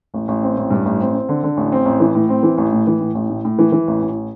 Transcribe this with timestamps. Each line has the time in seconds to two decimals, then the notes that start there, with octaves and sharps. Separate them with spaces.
0.14 A1
0.28 A1
0.43 C4
0.57 A1
0.71 G2
0.85 A1
1.00 C4
1.14 C4
1.29 D3
1.43 D3
1.57 A1
1.72 C4
1.85 A1
2.00 E3
2.15 A2
2.29 C4
2.43 E3
2.58 A1
2.72 A2
2.87 E3
3.00 A2
3.15 A1
3.30 A2
3.45 A2
3.59 E3
3.72 E3
3.87 A1
4.02 A1